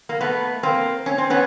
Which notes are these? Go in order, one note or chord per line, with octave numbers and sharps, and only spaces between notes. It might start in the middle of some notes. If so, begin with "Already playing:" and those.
A#3
A3 B3
A#3 C4
C#4
C4
B3 C#4